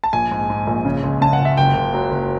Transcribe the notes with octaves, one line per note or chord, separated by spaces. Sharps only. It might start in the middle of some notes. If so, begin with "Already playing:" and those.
A5
A#1 G#5
G#2
G#2
A#1
C#3
C#2
C#3 A5
F#5
C#2
E5
F#1 G5
F#1
F#3
F#1